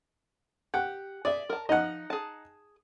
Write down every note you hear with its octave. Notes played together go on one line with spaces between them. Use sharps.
G4 F#5
G#4 D5 E5
A#4 A5
F3 F#3 D#4 D#5 F#5
G#4 A5